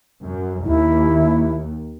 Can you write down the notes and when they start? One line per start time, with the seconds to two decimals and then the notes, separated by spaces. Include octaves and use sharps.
0.22 F#2
0.64 D#2 E4